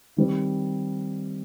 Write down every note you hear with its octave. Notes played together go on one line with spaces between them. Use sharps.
D#3 G3 C4